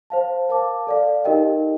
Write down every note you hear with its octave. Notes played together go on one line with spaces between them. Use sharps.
C5 F5 A5
A#4 F5 A5 D6
A4 D5 F5
D#4 G4 A#4 D#5 G5